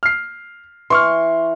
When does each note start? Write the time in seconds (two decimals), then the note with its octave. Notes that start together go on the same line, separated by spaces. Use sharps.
0.03 F6 C7
0.90 E3 C6 C#6 F6